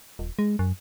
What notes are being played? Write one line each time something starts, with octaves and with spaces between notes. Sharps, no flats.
D#1
G#3
F#2